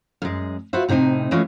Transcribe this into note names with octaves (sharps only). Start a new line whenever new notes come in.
F#2 G#3
F4 F#4 B4 C5 E5
A2 C3 C4 D#4 G#5
E3 G#3 A3 C#4 F4